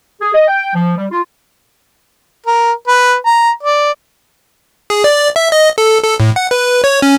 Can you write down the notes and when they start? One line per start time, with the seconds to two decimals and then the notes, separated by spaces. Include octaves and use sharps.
0.21 G#4
0.34 D#5
0.48 G5
0.74 F3
0.97 G3
1.11 F4
2.46 A#4
2.88 B4
3.26 A#5
3.63 D5
4.90 G#4
5.04 D5
5.36 E5
5.52 D#5
5.78 A4
6.04 A4
6.20 A2
6.36 F#5
6.51 B4
6.84 C#5
7.02 C#4